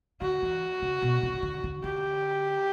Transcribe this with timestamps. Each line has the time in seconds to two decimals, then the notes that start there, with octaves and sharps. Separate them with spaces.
0.21 D3 F#4
0.42 E3
0.82 C#3
1.02 B2
1.23 C#3
1.33 C#3
1.43 D3
1.64 D3
1.84 D3 G4